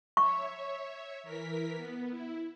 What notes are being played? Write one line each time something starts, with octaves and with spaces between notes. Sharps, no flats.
C#5 E5 C#6
E3 A#4 B6
B3
E4